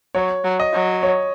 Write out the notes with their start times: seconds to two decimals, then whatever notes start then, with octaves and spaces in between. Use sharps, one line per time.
0.15 F#3 C#5
0.44 F#3
0.60 D#5
0.73 F#3
1.03 C#5